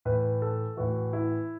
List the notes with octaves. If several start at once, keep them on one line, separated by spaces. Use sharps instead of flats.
A2 E3 B4
A4
A2 E3 F#4
E4